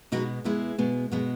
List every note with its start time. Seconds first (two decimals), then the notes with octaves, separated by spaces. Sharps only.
0.12 B2 G#3 B3 D#4 F#4
0.44 B2 G#3 B3 E4 G#4
0.78 B2 G#3 B3
1.12 B2 G#3 B3